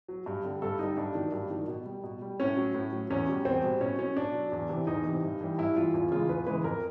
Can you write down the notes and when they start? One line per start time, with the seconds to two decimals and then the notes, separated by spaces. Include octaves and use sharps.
0.08 F#3
0.26 G2
0.44 D3 G3
0.62 G2 A4
0.79 D3 G3 D#4
0.97 G2 D4
1.15 D#3 F#3
1.32 G2
1.50 D#3 F#3
1.68 B2
1.86 G3
2.03 B2
2.22 G3
2.40 A2 C#4
2.57 F#3
2.75 A2
2.92 F#3
3.10 E2 C#4
3.28 B2 G3
3.45 E2 C4
3.63 B2 G3
3.81 B2 C#4
3.98 F#3 C#4
4.17 B2 D4
4.35 F#3
4.52 E2
4.69 C3 E3
4.87 E2 D#4
5.05 C3 E3
5.22 G2
5.41 E3 G3
5.58 G2 E4
5.76 E3 G3 F4
5.94 E2 F4
6.11 C#3 E3 G#3 F4
6.29 E2 B4
6.46 C#3 E3 G#3 B4
6.64 F2 A#4